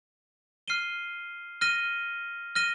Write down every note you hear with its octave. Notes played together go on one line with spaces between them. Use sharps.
F6 C7 D#7 G7
F6 A#6 D#7 G7
F6 A#6 D#7 G7